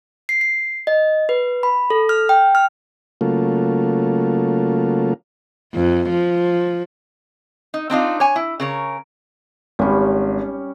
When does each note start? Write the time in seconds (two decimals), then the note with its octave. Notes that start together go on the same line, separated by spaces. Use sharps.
0.29 C7
0.41 C7
0.87 D#5
1.29 B4
1.63 B5
1.90 A4
2.09 F6
2.29 G5
2.55 F6
3.21 C#3 F#3 A3 A#3 F4
5.74 F2
6.10 F3
7.74 D#4
7.90 C4 D4 D#4 F4
8.20 C#5 G#5
8.36 E4
8.60 C#3 A#4 C#5
9.79 G#1 G3 C#4